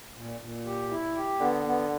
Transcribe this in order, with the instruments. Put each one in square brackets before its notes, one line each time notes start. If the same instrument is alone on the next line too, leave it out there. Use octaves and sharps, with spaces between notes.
[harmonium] A#2
A#2
G4
E4
G4
[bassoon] D3 [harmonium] B3
[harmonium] B3